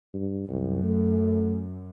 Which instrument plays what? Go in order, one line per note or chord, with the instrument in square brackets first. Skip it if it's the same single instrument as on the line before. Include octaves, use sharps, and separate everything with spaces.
[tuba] G2
[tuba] C2 [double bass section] F#2
[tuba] A3